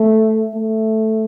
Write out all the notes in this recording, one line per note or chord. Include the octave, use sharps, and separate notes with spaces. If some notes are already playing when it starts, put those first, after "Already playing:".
Already playing: A3
A3